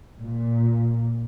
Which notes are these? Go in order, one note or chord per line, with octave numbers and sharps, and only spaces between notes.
A#2